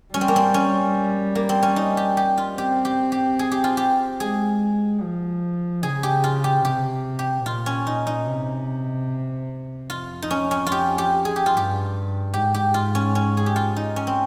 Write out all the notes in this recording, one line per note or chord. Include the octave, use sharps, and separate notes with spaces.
G3 C#4
C4
A#3
C4
C#4
A#3
C4
C#4
D#4
G4
G4
F4
C4 G4
G4
G4
G#4
G4
F4
G4
G#3 G#4
F3
C#3 G#4
G4
F4
G4
C3 G4
G4
A#2 F4
C#4
D#4
D#4
C3
F2 F4
D#4
C#4
C#4
F4
G4
G4
G#4
G4
F4
G2 G4
G#2 G4
G4
F4
C#4
C#4
G#4
G4
F4
D#4
C#4
C4